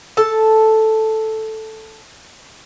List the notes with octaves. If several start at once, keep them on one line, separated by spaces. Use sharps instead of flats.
A4 A5